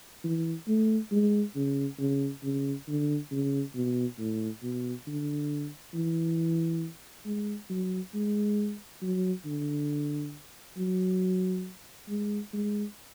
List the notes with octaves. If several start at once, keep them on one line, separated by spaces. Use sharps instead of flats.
E3
A3
G#3
C#3
C#3
C#3
D3
C#3
B2
A2
B2
D3
E3
G#3
F#3
G#3
F#3
D3
F#3
G#3
G#3